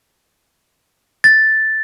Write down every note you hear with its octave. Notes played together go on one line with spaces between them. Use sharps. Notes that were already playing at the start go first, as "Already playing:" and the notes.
A6